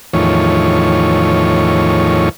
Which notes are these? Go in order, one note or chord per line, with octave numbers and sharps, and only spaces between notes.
E2 A2 D#3 F3 C#5